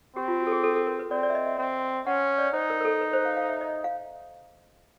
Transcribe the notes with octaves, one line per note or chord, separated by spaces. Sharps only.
C4 G4
F4
F#4
A4
G#4
A4
A4
A#4
B4
C4 D5
D5
E5
D#5
E5
C4
C#4 F#5
D5
D#4 C5
A#4
A#4
A4
B4
C5
F5
F5
E5
D#5
F5